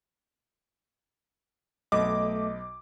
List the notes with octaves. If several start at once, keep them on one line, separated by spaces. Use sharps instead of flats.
B1 A3 D#5 D6